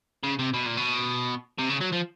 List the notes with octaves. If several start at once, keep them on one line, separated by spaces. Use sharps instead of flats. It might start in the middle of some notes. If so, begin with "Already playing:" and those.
C#3
C3
B2
A#2
B2
C3
C#3
F#3
F3